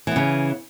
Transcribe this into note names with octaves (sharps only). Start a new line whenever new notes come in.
C#3 E3 B3